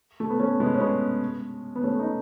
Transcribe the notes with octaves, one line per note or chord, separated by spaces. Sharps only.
A3
B3
A3 C#4
G#3 B3
C#4
G#3 B3
B3
A3 C#4
B3 D#4